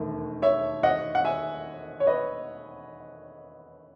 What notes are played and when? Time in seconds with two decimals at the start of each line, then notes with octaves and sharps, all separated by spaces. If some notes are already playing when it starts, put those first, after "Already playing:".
Already playing: E1 D#2 D#3 A3
0.42 C#5 E5
0.83 D#5 F#5
1.15 F#5
1.25 E5 G#5
2.00 C#5
2.07 B4 D#5